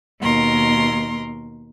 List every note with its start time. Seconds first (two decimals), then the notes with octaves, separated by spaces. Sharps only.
0.21 D#2 B2 A#4 C6